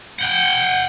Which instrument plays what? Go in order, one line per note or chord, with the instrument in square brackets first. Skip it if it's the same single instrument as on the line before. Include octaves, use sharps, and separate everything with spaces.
[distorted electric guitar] F#5 G5